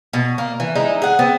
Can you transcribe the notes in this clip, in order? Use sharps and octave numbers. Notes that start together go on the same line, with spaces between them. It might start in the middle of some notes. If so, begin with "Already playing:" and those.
B2
A#3
E3
G#3 D#4 E4
G#4 F#5
B3 C4